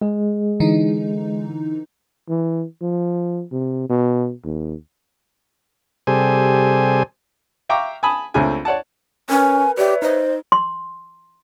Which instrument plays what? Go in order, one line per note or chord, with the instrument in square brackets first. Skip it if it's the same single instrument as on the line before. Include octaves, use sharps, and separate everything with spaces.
[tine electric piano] G#3 G#4
[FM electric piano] D3 E3 D#4
[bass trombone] E3
F3
C3
B2
D#2
[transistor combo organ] C3 G3 G#4 A4 C5 G#5
[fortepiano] E5 F5 G5 A#5 C#6 D6
G#5 A5 B5 D#6
C#2 A3 C4 D4 G#5
C#5 D5 F#5 A5
[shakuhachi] C#4 [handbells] A#4 B4 [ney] G#5
[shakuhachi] G4 [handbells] B4 C#5 E5 [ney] D5
[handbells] D#4 [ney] C5 [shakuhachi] D#5
[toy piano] C6